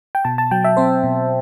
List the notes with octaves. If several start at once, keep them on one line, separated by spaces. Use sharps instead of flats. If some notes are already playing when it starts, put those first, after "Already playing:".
G5
B2 A5
A5
F#3 G5
E5
C4 C5
B2